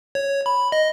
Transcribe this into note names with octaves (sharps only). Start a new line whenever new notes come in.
C#5
B5
D#5